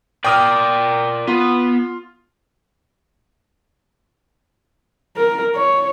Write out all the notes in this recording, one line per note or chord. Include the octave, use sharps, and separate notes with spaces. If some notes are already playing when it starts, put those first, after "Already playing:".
A#4 D5 G5 D#6 F6
B3 F4
A#4
C#5